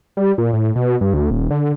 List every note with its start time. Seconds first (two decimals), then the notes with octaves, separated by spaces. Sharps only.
0.17 G3
0.38 A#2
0.53 A2
0.76 B2
1.01 G2
1.14 D2
1.31 D#1
1.50 D3